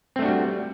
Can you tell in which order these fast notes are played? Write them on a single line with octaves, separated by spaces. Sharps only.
C4 A3 D4 F#4 G3